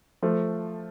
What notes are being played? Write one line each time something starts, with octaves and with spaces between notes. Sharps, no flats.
F3 A3